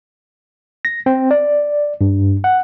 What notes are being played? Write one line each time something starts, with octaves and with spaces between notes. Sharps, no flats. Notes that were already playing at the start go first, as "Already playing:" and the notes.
A#6
C4
D5
G2
F#5